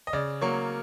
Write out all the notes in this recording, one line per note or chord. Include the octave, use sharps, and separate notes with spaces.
D#5
C#3 D5
F#3 A#3 C#5